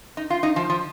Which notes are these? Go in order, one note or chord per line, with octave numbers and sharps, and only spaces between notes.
D#4
F4
D#4
F3
F3